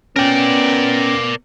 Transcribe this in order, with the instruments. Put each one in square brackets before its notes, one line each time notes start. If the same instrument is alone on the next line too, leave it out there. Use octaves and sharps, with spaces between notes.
[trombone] B3 [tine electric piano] C#4 G5 [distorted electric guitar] A#4 D5